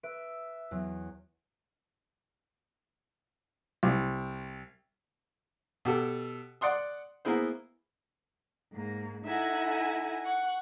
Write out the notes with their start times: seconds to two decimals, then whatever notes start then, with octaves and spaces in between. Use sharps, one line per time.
0.03 B4 E5 D7
0.71 E2 F#3
3.83 C2
5.85 B2 G4 A4
6.61 D5 F#5 C6 D#6
7.25 A#3 B3 E4 G#4 C5
8.73 G#2 A#3
9.25 D#4 E4 A4 E5 F#5 G#5
10.23 F#5 C#6